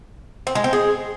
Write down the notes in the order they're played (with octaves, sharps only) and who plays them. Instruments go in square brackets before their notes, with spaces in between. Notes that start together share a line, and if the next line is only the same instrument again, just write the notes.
[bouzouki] C4
G#3
C4
G#4